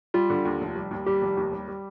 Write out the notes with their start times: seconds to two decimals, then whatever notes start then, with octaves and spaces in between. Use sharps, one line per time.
0.14 G3 F4
0.30 D3
0.45 D#2
0.61 F1
0.75 G3
0.91 D#2
1.06 G3 G4
1.22 F1
1.37 D#2
1.53 G3
1.68 G3